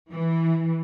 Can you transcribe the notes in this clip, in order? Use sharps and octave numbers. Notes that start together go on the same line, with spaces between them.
E3